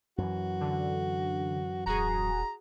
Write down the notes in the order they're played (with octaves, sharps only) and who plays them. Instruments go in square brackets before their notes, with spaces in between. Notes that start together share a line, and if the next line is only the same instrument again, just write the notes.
[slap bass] F#2 E3 [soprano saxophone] F#4
[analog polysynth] D3
[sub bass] D#1 [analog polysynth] F#4 G#4 [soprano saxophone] A#5